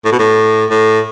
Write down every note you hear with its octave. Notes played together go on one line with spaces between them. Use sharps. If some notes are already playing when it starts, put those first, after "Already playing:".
A2
B2
A2
A2